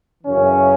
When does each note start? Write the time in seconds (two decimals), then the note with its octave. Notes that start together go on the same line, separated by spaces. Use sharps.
0.24 F#2 C#3 E3 C#4